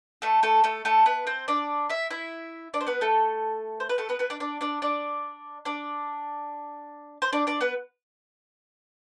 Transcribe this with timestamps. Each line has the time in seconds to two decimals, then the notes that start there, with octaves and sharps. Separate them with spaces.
0.22 A3 A4
0.43 A3 A4
0.64 A3 A4
0.85 A3 A4
1.06 B3 B4
1.27 C4 C5
1.48 D4 D5
1.90 E4 E5
2.11 E4 E5
2.74 D4 D5
2.81 C5
2.87 B3 B4
3.01 A3 A4
3.80 C5
3.89 B4
3.98 A3 A4
4.09 B3 B4
4.19 B3 B4
4.30 D4 D5
4.40 D4 D5
4.61 D4 D5
4.82 D4 D5
5.65 D4 D5
7.22 C5
7.33 D4 D5
7.47 D4 D5
7.61 B3 B4